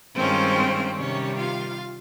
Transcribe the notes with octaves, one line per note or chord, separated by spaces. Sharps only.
G2 D#3 G#3 C4 C#4 F4 C5
C3 D#3 G3 C#4 C#5
F4 F5